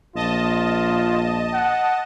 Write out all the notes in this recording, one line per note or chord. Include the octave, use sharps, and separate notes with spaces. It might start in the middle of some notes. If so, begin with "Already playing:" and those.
A#1 F4 D#5 A5
F#5